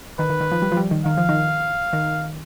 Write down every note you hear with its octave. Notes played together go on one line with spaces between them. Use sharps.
D#3 B4
D#3
D#3
F3
G3
F3
G3
D#3
D#3 F5
F3
D#3
D#3